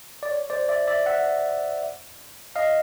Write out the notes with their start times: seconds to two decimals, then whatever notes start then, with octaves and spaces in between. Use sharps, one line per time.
0.23 D5
0.31 C#5
0.50 C5 D5
0.69 D5 E5
0.87 D5 E5
1.06 E5 F#5
2.56 D#5 F5